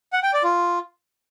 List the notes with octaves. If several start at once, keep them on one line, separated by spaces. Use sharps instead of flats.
F#5
G5
D5
F4